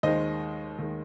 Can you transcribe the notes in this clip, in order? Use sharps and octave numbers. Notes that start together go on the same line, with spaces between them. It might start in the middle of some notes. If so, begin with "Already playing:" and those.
D#2 D#3 G#3 C5 D#5
D#2 D#3 G#3